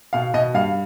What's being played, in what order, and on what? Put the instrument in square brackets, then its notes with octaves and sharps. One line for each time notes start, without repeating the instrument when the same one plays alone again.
[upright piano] B2 F5
B2 D#5
G2 F5